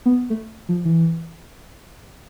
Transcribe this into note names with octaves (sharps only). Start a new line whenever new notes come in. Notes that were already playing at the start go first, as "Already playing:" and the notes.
B3
A3
F3
E3